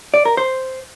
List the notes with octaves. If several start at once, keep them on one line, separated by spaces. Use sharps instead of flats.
D5
A#4
C5